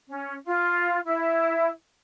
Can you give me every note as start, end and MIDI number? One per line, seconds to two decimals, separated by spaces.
0.08 0.34 61
0.46 0.98 65
1.05 1.69 64